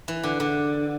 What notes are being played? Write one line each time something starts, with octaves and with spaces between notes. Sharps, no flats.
E3
D3
D3